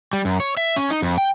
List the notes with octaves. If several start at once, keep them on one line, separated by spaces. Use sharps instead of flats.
G3
F#2
C#5
E5
C#4
D#4
F2
G5